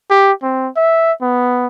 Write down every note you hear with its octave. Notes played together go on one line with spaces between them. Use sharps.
G4
C4
E5
B3